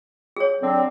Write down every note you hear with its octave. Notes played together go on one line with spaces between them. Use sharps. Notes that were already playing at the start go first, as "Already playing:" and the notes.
G#4 C#5
D3 F#3 C4